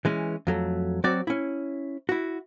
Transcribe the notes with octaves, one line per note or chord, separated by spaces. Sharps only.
E3 G#3 C#4
F2 F#3 A3
F#3 C4 F#4 D5
C#4 E4
E4 F#4